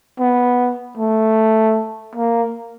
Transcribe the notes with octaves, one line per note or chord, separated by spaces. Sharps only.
B3
A3
A#3